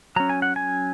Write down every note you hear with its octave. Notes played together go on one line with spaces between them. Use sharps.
F#3 C#4 A#5
G#5
F#5
G#5